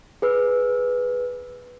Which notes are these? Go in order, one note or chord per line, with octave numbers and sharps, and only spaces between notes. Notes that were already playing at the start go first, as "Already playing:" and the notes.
G#4 B4 E6